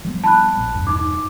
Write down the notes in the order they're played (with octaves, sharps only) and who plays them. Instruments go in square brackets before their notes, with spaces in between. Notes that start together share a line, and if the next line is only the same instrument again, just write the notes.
[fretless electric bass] F3 G3 B3
[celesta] A5 B5 F#6
[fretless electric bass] A#1
E1 G2
[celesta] D#4 D6